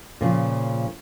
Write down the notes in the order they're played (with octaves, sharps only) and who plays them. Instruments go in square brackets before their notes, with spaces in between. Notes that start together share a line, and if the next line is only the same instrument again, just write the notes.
[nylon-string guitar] A#2 C#3 F3